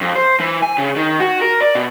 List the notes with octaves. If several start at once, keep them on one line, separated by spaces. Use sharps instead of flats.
F2
C5
E3
G#5
C#3
D#3
F#4
A#4
D5
B2